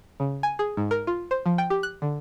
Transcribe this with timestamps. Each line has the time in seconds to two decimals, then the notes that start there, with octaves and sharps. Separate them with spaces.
0.20 C#3
0.43 G#5
0.59 G#4
0.77 G#2
0.91 A#4
1.07 F4
1.31 C5
1.46 F3
1.58 G5
1.70 G4
1.83 F#6
2.02 D3